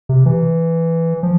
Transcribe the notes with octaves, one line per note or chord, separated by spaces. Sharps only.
C3
E3
F3